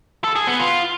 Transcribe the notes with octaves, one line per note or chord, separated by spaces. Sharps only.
A4
G#4
B3
F4